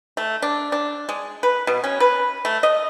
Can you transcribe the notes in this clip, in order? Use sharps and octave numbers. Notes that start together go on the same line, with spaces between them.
A3
D4
D4
G#3
B4
B2
C#4
B4
A3
D#5